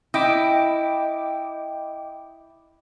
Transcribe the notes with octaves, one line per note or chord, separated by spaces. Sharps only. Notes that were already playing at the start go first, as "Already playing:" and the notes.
E4 D#5 G5 D6